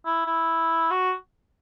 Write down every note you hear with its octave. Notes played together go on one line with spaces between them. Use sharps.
E4
E4
F#4